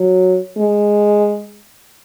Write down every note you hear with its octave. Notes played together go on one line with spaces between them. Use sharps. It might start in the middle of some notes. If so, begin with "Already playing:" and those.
Already playing: F#3
G#3